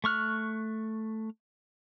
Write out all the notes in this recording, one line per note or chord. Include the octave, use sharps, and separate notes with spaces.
A3 C#6 F6 F#6